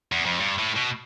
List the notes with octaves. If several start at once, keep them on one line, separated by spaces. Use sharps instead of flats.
E2
F2
G2
A2
B2